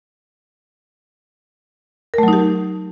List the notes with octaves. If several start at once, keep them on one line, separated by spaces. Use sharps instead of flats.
F#3 A3 D#4 G4 A#4